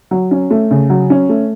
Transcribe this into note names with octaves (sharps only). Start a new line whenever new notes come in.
F#3
C#4
A3
C#3
F#3
C#4
A3